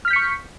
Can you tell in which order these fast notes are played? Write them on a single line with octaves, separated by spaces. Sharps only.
F6 B6 G6 C#7 C#6